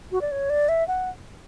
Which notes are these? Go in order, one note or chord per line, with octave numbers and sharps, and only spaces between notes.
F#4
D5
C#5
D5
E5
F#5